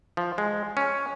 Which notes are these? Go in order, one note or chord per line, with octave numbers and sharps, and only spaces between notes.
F3
G#3
C#4